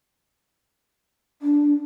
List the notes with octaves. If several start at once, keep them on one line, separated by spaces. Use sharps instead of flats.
D4